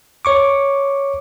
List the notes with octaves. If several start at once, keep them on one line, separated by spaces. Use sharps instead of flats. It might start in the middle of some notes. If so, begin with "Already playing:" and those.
C#5 C#6 D6